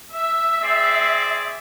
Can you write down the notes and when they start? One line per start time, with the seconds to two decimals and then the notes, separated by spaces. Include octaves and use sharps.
0.14 E5 E6
0.63 C4 G#4 D5 C7